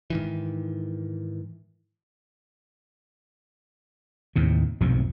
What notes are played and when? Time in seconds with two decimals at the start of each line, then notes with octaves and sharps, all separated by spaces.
0.10 G#2 D#3 E3
4.36 D#2 A2 C3
4.81 B1 F2 G#2 C3